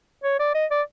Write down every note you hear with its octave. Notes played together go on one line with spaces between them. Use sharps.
C#5
D5
D#5
D5